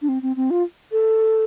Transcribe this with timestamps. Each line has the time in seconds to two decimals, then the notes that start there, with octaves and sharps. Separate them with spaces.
0.02 D4
0.09 C4
0.22 C4
0.36 C4
0.51 F4
0.92 A4